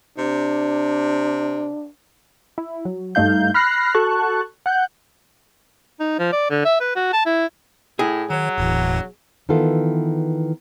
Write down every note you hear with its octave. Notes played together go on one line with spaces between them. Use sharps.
C3 D4
E4
F#3
G2 A3 D#4 F5 G6
B5 F6 F#6 A#6 C7
F#4 A4 A5 C#6 F#6
F#5 F#6 G6
D#4
F3
D5
D3
E5
B4
F#4
A5
E4
A2 G#4
D#3 F#3 C#5
E1 D#2 A2 E3
D#3 E3 B3 F4 A4